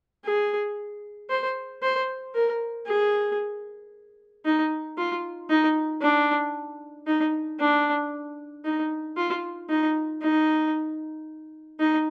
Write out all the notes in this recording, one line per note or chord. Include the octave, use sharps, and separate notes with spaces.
G#4
C5
C5
A#4
G#4
D#4
F4
D#4
D4
D#4
D4
D#4
F4
D#4
D#4
D#4